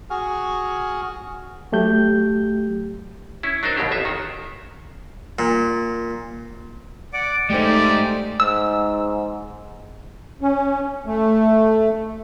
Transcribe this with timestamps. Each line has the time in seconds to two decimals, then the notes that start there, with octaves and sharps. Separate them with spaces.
0.10 F#4 G#4 F#5 G#5 C#6 F6
1.72 F#3 A3 G4 G6
3.43 C#4 E4
3.63 F#3 D4 D#4 A#4 C5
3.77 D#2 B2 F#3 G4
3.91 A1 F4 E5
4.05 D#3 F#4
5.39 A#2
7.13 D5 F#5 D6
7.50 G#3 A3 D#4 G4 C5 D5
8.40 G#2 E6
10.41 C#4
11.06 A3